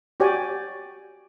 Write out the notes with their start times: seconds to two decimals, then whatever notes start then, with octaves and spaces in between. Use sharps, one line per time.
0.20 F#4 G4 C#5 D5 G5 G#5